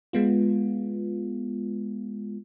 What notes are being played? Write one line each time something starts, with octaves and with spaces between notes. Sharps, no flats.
G#3 B3 F4